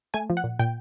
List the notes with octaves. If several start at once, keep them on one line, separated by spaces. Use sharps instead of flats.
A3 G#5
F3
F#5
A#2
A#2 G5